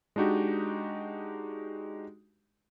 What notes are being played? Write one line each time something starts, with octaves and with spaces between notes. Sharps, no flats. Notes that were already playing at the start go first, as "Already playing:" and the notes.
G#3 D4 D#4 F#4 G4